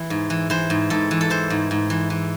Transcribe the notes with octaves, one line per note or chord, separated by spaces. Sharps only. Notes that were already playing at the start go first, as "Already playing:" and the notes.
Already playing: E3
G#2
E3
E3 C5
G#2
G#2 A4
E3
A4
E3 C5
G#2
G#2
E3
E3